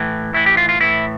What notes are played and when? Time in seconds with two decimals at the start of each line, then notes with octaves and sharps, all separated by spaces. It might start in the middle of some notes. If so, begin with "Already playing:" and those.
Already playing: A2 E3
0.34 A2 E3 E4
0.46 G4
0.57 F4
0.69 F4
0.80 A2 E3 E4